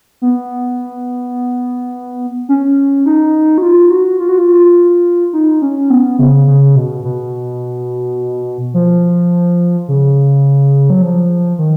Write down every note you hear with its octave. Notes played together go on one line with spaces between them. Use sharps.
B3
C#4
D#4
F#4
F4
F#4
F4
F#4
F4
D#4
C#4
B3
C#3
C#3
B2
B2
F3
C#3
F#3
F3
D#3